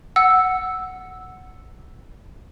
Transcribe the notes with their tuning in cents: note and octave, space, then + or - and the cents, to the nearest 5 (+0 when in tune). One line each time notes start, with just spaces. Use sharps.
F#5 +0 E6 +0